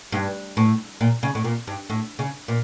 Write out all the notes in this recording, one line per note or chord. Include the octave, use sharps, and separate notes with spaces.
G2
A2
A#2
C#3
A2
A#2
G2
A2
C#3
A#2